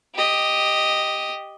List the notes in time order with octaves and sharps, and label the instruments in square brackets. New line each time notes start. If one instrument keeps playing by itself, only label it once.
[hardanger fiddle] G4 D#5